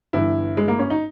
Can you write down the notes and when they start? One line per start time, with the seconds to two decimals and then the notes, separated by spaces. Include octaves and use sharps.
0.13 G1 G2 E3 E4
0.57 G#3
0.68 A#3
0.79 C#4
0.90 D#4